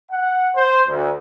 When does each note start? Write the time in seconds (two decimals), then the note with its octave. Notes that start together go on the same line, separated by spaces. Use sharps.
0.11 F#5
0.55 C5
0.89 D2